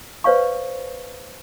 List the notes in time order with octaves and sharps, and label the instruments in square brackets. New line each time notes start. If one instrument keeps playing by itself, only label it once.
[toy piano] B4 C5 D5 F5 C#6